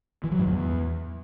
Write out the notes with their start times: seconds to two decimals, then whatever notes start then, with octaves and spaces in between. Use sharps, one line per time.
0.24 E3
0.32 F#3
0.39 G#2
0.47 E2